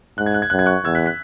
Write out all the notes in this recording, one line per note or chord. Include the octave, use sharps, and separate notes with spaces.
G#2 F#6
G#6
F#6
G#6
F#2 F#6
G#6
C#6 F#6
E2 E6 G#6
F#6 B6
F#6 B6